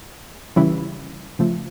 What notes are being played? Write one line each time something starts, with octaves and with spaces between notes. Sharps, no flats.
C#3 E3 G3 C#4 E4
C#3 F3 A3